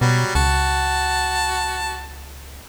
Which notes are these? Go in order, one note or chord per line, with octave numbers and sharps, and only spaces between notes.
B2 F#3 G3
C#2 F#4 A5